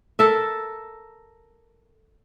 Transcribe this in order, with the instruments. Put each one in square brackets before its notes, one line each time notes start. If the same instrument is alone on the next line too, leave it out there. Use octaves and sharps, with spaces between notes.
[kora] A4 A#4 E5